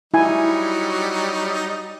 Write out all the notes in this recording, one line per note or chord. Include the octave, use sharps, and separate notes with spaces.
F#3 G3 D#4 E4 G#5